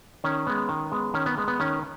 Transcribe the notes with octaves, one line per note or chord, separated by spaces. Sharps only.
D#3 C#4
G#3 B3
D#3
G#3 B3
D#3 C#4
B3
G#3 B3
B3
D#3 C#4